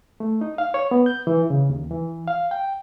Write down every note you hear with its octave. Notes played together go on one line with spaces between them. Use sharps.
A3
D#4
F5
C#5
B3
G6
E3
C#3
D#2
E3
F5
G5